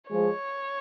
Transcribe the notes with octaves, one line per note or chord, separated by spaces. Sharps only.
F3 G#3 C#5